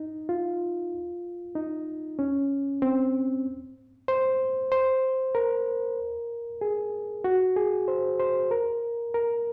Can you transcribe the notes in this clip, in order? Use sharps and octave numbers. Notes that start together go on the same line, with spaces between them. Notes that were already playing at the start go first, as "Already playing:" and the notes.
Already playing: D#4
F4
D#4
C#4
C4
C5
C5
A#4
G#4
F#4
G#4
C5
C5
A#4
A#4